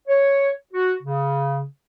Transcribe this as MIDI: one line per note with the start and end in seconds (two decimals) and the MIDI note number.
0.08 0.49 73
0.73 0.93 66
1.02 1.64 49